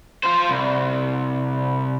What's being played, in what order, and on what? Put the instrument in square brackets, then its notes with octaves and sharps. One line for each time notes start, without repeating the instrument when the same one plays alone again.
[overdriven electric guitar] F4 C5
C2